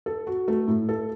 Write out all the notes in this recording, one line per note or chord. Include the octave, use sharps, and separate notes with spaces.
A4
F#4
A3
A2
A4